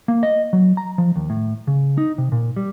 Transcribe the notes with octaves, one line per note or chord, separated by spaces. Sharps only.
A#3
D#5
F#3
A#5
F3
D#2
A2
C#3
D#4
C3
A#2
G3